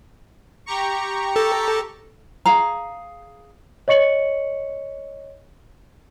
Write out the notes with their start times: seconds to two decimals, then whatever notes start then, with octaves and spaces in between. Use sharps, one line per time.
0.66 G4 A#5 C#6
1.36 A4
2.46 G#4 F5 A#5
3.88 C#5 D#5 C#6 C#7 F#7